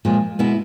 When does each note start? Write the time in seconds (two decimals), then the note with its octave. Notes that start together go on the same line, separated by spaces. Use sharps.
0.05 A#2 F3 G#3
0.39 B2 G#3 B3 E4